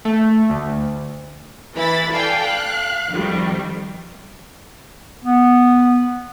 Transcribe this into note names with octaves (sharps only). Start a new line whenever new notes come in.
A3
D2
E3 E4 B5 A6
A4 D5 F5 G5 G#5
F5 F#6
F2 D#3 G3
B3